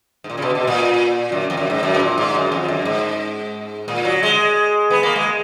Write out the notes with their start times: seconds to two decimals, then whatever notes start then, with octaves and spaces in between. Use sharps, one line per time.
0.24 G#2
0.30 A#2
0.37 C#3
0.42 B2
0.55 B2
0.67 A#2
1.32 F#2
1.50 F2
1.57 F#2
1.70 G#2
1.83 F#2
1.95 B2
2.00 A#2
2.18 G#2
2.34 F#2
2.52 F2
2.68 F#2
2.85 G#2
3.88 A#2
4.05 F#3
4.23 G#3
4.90 B3
5.03 A#3
5.16 G#3